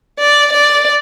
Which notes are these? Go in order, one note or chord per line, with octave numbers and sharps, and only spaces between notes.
D5
D5